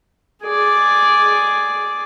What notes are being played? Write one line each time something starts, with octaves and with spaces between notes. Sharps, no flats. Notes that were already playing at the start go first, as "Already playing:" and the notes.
G#4 D5